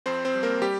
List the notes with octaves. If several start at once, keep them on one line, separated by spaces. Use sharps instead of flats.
F2 C4 C5
C4 C5
G3
A#3 A#4
G3 G4